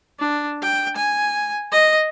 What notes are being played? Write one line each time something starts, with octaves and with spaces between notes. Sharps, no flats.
D4
G5
G#5
D#5